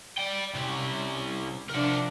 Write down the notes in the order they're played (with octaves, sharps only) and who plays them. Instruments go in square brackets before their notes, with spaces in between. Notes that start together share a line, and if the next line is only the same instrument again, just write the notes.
[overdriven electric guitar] D5 G5
[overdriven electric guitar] C3 G3 [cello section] C#4
[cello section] C3 F3 D4 [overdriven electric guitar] A#4 F#5